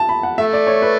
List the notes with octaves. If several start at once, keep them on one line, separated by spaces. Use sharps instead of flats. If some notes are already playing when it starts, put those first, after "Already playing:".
Already playing: A5
B5
F#5
A3 E5
D5
C#5
B4